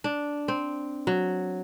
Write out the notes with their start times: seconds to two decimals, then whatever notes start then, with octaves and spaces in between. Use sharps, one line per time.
0.04 D4
0.48 C4
1.07 F#3